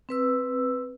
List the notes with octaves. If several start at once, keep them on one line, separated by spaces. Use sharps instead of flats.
C4 B4 E6